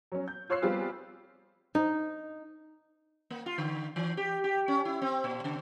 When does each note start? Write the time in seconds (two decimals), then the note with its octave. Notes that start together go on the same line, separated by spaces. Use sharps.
0.12 F#3 C#4
0.28 G6
0.50 F4 C#5 C6 E6 F#6 C7
0.62 G3 B3 C4 F4 G#4
1.75 D#4
3.30 A#3
3.46 F4
3.58 D3
3.96 E3
4.17 G4
4.44 G4
4.68 C#4
4.85 E4
5.02 C4
5.24 A#2
5.44 C#3